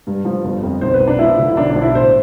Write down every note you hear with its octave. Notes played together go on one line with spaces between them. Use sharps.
G2
F3
G1
F2
B1 C5
B4
B1
D4
F3 E4
D3
E4
B1 D4
D4
B1
E4
A1 C5